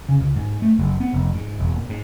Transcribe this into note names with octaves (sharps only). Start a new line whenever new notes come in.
C#3
C#2
G#2
A3
F#1
B3
F1
G#2
E1
A#2
G#2